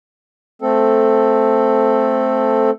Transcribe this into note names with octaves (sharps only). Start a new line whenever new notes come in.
A3 C4 A4